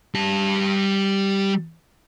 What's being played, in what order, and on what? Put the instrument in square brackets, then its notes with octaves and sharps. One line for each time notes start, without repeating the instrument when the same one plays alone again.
[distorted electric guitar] G3 A5